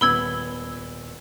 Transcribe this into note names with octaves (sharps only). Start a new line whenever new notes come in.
D#1 B3 B5 E6 G#6 G7